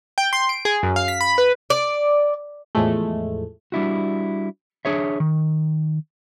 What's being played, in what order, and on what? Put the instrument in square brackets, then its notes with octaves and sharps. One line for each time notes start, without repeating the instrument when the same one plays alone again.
[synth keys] G5
C6
D7
G#4
F#2
F5
B6
B5
B4
[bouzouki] D5
[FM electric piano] E2 A2 F3 G#3 A3
[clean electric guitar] G3 D4 E4 F#4
D4 G#4 C#5 E5
D#3